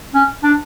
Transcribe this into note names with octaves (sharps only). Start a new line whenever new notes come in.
C#4
D4